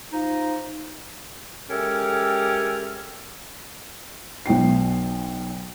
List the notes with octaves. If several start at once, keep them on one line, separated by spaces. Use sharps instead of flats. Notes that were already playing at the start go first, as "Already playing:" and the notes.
F3 D#4
G#3 C#4 G4 A4 A#4 E5
B1 B2 G5 C7